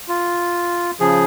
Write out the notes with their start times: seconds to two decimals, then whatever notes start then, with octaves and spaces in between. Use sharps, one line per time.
0.08 F4
1.00 C#3 F3 G#4